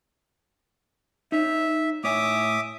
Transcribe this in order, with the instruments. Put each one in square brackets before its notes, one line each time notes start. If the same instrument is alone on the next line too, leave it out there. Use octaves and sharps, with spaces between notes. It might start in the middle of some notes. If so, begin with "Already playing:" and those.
[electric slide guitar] D#4 C#5 [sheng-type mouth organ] E5
[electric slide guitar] A2 C#5 G#5 [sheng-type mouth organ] E5 D6 D#6